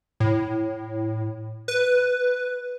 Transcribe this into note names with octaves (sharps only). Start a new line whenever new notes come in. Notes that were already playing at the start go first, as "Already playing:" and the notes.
A2
B4